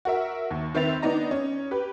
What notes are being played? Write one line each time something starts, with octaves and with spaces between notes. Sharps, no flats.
F#4 A#4 E5
D#2
D#3 C4 B4 E5 A6 F7
B3 D4 D#4 D#5 A#5
C#4
G4 B4